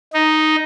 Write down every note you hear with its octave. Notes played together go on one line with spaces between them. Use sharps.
D#4